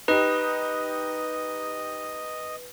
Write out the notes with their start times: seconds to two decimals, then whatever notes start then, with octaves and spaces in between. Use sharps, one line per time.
0.08 D#4 G4 B4 D#5